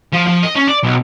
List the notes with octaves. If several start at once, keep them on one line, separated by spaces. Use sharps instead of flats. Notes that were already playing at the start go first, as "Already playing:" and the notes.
F3
F3
D#5
C#4
D5
B1